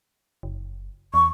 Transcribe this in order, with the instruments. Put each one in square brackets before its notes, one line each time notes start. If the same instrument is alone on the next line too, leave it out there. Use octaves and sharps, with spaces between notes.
[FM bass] F#1
[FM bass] E2 [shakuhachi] C#6